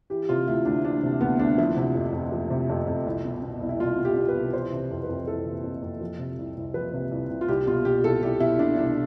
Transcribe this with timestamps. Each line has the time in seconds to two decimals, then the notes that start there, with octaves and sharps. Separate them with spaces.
0.10 E3 G4
0.29 C3 F4
0.48 D2 E4
0.65 D2 D4
0.84 E3 D4
1.03 C3
1.21 D2 B3
1.39 D2 D4
1.58 F3 E4
1.77 C3
1.95 F2
2.13 F2
2.32 F3
2.50 C3
2.69 F2
2.87 F2
3.06 C2
3.25 B2
3.42 B2
3.61 C2
3.69 E4
3.79 C2 F4
3.98 B2
4.05 G4
4.16 B2
4.29 B4
4.35 C2
4.53 E3 C5
4.72 C3
4.91 F2
5.03 B4
5.09 F2
5.27 E3 A4
5.45 C3
5.63 F2
5.82 F2
6.01 F3
6.19 C3
6.38 C2
6.57 C2
6.74 F3 B4
6.93 C3
7.11 C2
7.30 C2
7.41 F4
7.48 C2 G4
7.67 B2 F4
7.85 B2 G4
8.04 C2 A4
8.23 C2 G4
8.40 B2 E4
8.59 B2 D4
8.77 C2 D4